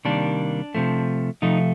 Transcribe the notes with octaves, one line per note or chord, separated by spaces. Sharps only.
C3 D#3 G3 A#3 D4
C3 F3 A3
C3 F3 A3 D#4